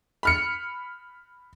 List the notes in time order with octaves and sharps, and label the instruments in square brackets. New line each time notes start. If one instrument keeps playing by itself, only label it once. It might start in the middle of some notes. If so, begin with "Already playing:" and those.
[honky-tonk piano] B5 F6 C#7